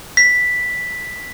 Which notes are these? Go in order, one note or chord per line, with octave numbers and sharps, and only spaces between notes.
B6